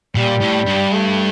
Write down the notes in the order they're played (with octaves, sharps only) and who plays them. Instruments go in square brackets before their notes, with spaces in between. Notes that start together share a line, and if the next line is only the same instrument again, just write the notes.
[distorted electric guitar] A#2 [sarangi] G3
[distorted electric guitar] A2
G2
[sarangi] A3